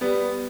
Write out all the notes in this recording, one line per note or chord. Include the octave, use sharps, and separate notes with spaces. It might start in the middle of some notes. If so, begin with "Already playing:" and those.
G3 B3